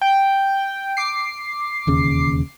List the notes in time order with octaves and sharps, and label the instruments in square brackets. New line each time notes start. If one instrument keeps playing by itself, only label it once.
[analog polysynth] G5
D6 C7
[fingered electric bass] E1 D#2 C#3